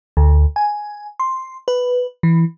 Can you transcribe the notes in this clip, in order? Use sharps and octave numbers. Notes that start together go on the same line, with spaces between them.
D2
G#5
C6
B4
E3